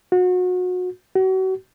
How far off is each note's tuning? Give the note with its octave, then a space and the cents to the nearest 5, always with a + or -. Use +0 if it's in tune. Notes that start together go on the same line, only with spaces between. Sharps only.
F#4 -30
F#4 +35